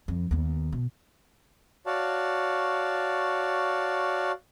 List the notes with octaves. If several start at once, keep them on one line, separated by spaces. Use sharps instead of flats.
F2
D#2 B3
B2
F#4 C#5 D5 F5 A5